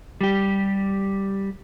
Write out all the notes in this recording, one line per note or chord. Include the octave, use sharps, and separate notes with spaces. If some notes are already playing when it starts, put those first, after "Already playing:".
G3 G4